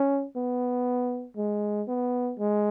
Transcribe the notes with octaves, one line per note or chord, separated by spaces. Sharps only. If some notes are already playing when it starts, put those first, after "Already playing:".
Already playing: C#4
B3
G#3
B3
G#3